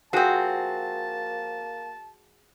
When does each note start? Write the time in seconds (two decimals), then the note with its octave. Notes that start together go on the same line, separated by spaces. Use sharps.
0.13 F3 A#3 C4 F#4 G#4 A5